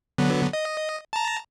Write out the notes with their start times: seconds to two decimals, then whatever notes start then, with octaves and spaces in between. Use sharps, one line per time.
0.18 D3 F#3 B3
0.53 D#5
1.13 A5 A#5